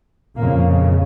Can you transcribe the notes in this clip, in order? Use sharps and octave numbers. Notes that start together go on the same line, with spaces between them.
F2 A#2 C#3 A#3